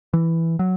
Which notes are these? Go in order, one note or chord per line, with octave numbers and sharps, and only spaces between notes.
E3
F#3